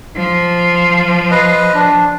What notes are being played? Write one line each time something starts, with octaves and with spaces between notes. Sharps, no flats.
F3
B4 D#5
D4